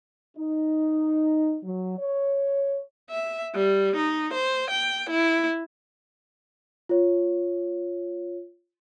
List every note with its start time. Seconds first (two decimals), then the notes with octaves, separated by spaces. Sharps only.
0.37 D#4
1.63 F#3
1.99 C#5
3.10 E5
3.55 G3
3.97 D#4
4.34 C5
4.71 G5
5.10 E4
6.89 F4 C#5